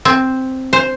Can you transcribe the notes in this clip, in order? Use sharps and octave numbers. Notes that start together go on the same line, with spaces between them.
C4
C5